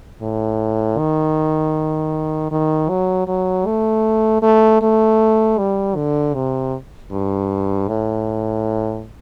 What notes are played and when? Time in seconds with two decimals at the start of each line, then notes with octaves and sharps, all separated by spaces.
0.22 A2
0.98 D#3
2.51 D#3
2.89 F#3
3.28 F#3
3.66 A3
4.42 A3
4.82 A3
5.58 G3
5.96 D3
6.34 C3
7.11 G2
7.88 A2